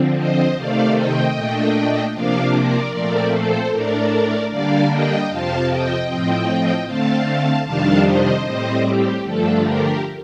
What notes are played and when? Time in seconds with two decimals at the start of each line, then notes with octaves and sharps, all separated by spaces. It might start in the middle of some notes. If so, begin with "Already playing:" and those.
Already playing: D3 F3 C4
0.17 C5 D#5
0.56 C3 D#3 A3 C4 D5 F5
0.96 D#5 G5
1.35 A#2 A3 D4
2.14 C3 F3 A#3 D4 D5 F5
2.54 A#4 D5
2.93 A#2 F3 A3 C4 A#4 D5
3.32 A4 C5
3.71 A2 A3 D4 A#4 D5
4.50 D3 G3 A#3 D4 D5 F5
4.90 D#5 G5
5.29 F2 C3 F3 C4 F5 A5
5.68 D#5 G5
6.08 A2 F3 C4 D#5 G5
6.86 D3 A3 C4 F5 A5
7.65 F2 C3 D#3 G3 D4 F5 A5
8.05 C5 D#5
8.44 A2 G3 C4 C5 D#5
8.84 G4
9.23 G2 D3 F3 A3 D4 A4
9.63 G4 A#4